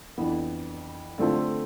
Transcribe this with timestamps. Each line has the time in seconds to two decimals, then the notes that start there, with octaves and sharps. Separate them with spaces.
0.17 F2 E3 B3 D4
1.18 D3 A3 C4 F4 A4